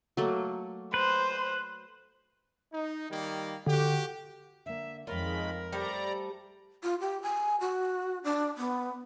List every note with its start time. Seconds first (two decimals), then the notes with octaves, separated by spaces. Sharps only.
0.17 F#3 A3 A#3
0.94 B4 C5
2.72 D#4
3.10 D#3 G3 A#3
3.66 D3 F#4 G4
4.66 D3 A#3 E5
5.07 F2 D#3 G#3 F4 A#4 C#5 B5
5.72 G3 A3 C5 D5 A#5
6.83 F4
7.00 G4
7.23 G#5
7.61 F#4
8.24 D4
8.58 B3